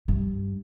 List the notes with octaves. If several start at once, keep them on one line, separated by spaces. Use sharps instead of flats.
G2